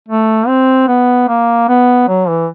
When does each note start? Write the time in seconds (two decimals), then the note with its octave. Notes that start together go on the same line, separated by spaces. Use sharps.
0.08 A3
0.47 C4
0.88 B3
1.28 A#3
1.69 B3
2.09 F#3
2.29 E3